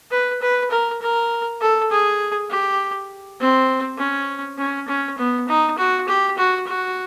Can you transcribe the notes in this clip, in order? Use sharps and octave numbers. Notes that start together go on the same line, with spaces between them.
B4
B4
A#4
A#4
A4
G#4
G4
C4
C#4
C#4
C#4
B3
D#4
F#4
G4
F#4
F#4